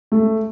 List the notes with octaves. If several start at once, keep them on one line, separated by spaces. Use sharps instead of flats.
A3